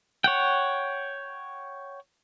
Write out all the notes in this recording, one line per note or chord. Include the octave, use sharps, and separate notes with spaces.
C#5 F#5 G5